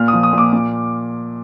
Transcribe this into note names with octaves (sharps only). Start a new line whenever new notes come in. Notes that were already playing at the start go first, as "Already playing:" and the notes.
Already playing: A#2 F6
D#6
F3
D#6
A#2
D6
A#2